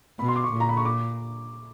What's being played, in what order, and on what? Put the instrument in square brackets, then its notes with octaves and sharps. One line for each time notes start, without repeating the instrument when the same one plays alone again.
[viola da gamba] B2 [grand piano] B5
[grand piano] C6
D6
C#6
[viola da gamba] A#2
[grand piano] A#5
B5
C#6
D6